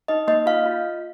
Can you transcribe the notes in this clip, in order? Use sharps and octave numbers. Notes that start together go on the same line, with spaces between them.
D#4 D#5
A#3 D#5
F4 F5
F4